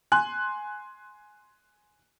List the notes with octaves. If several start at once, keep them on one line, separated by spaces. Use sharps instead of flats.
G#5 C6 F#6